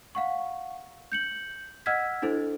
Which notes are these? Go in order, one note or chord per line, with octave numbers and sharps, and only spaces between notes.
F5 F#5 C#6
G6 C#7 F#7
D#5 F#5 E6 F6 G#6 B6
D4 E4 A4 C5